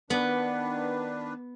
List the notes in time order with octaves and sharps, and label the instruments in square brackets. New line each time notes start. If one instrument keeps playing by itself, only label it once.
[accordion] D#3 D4 B4 [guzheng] B3